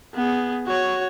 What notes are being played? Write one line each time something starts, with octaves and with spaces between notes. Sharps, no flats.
B3 G#4
F#4 C#5